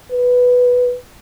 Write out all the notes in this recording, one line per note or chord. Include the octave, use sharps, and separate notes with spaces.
B4